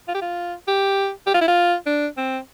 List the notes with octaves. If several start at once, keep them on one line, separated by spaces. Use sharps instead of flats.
F4
G4
F4
G4
G4
F4
E4
F4
D4
C4